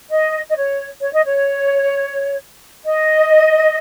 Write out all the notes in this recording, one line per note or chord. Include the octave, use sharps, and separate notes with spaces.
D#5
D#5
C#5
C#5
D#5
C#5
D#5